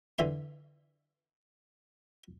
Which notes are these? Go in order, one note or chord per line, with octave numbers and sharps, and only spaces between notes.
D3 E3 E5 C6